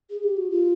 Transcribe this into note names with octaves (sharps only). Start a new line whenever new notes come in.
G#4
G4
F#4
F4